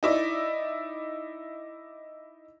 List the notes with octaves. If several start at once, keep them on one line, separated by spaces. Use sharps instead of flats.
D#4 E4 D5